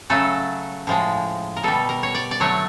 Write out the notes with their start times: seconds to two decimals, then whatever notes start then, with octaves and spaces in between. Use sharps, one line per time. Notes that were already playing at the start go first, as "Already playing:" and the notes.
0.10 C#3 F#3 A3 A4
0.87 A2 F3 G#3
1.56 A#4
1.63 B2 G3 A4
1.89 A#4
2.03 C#5
2.14 D5
2.31 D5
2.40 D3 F#3 A3 C#5